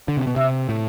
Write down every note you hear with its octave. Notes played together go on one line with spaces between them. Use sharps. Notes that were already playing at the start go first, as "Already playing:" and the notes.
D3
C3
B2
C3 E5
A2